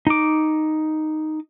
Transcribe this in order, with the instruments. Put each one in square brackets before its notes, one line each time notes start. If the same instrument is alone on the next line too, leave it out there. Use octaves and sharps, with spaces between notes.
[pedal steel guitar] D#4 D6